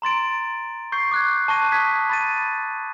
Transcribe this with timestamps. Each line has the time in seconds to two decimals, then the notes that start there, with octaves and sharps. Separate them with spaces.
0.02 A#5 C6 A6 D7
0.92 C#6 G6 C7
1.12 D6 F#6 G#6
1.48 A5 C#6 F#6 A#6 D#7
1.72 D#6 G#6 B6
2.09 B5 A6 D#7